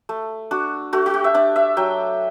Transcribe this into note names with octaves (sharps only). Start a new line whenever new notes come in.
A3
D4 F#4
A3 F#4
F#4
G4
E5
D4 D5
E5
F#3 G5